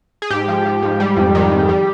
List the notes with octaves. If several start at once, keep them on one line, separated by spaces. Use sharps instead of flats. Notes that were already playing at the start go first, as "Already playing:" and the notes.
G#4
G#2 G4
F3
F3
G#2
G3
F2
D#3
F2
G3